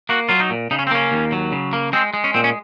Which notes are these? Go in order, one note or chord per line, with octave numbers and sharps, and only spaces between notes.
A#3 F#4
F#3 F4
D#4
A#2
C#3 D#4
C#4
C4
A#3 C#4
D#2
F#3
C#3
A#3
G#3 C4
G#3
C#4
A#2 C4
C#4